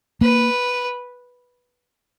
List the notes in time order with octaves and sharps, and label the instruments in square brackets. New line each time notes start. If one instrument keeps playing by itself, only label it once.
[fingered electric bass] A#3 [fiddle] B4